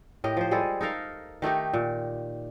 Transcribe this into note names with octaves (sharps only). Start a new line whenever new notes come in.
A2 G4 A#4 D#5
F3 C5
G3 G#3 G#4 A4
D#4 A4 A#4 F5
D#3 A3 D#4 G4
A#2